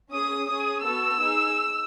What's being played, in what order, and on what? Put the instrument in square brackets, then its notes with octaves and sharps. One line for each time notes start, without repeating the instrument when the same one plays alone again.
[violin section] C#4 G#4 D#6
C#4 G#4 D#6
B3 F#4 A4 E6
D#4 G#4